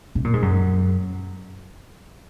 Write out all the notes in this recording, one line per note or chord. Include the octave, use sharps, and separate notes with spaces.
C3
A#2
G#2
F#2